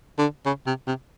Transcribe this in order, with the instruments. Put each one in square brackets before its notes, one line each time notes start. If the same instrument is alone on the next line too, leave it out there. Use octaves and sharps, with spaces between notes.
[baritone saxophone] D3
C#3
C3
C3